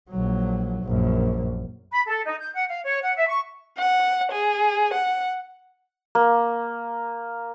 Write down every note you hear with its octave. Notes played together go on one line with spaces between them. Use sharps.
A#1 F#3
A#1 F#2
B5
A4
D#4
G6
F#5
F5
C#5
F#5
E5
C#6
F#5
G#4
F#5
A#3